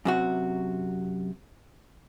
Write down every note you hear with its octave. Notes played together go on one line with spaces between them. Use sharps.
F#2 C3 F#4